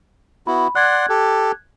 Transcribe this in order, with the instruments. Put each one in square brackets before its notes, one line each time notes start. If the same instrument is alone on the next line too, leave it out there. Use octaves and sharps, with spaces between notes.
[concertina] B3 E4 F#4 [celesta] B5
[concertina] D5 F#5 C6 [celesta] F#6 G#6
[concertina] G4 A4